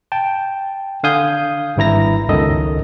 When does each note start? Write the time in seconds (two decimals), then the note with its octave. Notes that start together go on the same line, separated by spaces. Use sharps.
0.12 G5 A5
1.04 D3 F5 G#5 D#6 G6
1.77 G#1 G2 E4 A#5 A#6
2.29 G1 C#2 F#2 D#3 A4 D#5